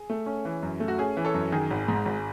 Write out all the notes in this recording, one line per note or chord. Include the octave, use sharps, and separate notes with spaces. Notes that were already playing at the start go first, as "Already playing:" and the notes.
Already playing: G#4
A3
C#4
E3
F#2
A3
F#4
C#4 G#4
E3
A4 C#5
F#2
D#3 G#4
G#1
G#2
G#1